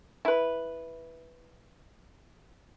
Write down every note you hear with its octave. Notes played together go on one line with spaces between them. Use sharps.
E4 B4